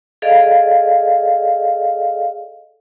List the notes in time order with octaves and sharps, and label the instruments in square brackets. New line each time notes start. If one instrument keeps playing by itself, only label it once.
[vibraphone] G#4 A4 D5 D#5 F5